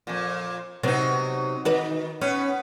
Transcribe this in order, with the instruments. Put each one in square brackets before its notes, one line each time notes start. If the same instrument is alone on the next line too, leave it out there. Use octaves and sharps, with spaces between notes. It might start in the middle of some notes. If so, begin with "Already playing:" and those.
[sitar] F2 A#2
[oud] C3 B3 C4 [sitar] F#3 D#4
[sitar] D#3 [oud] D#4 F#4 B4
[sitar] B3 B4 [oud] C#4